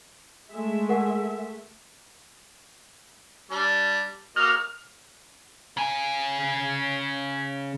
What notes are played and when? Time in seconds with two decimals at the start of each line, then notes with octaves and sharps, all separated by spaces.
0.51 G#3 A3 E5
0.89 G#4 A#4 F#5
3.51 G3 D4
4.36 A#3 F#4 D#5 F6
5.77 C#3 G#5